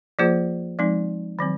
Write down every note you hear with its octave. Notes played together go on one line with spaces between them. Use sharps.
F3 A#3 F4 G#4 C5
F3 G#3 C4 D#4
D#3 F#3 C4